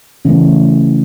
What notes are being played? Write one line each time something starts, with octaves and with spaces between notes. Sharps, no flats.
C#3 E3 A3